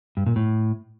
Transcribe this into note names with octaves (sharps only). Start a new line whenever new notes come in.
G2
A#2
A2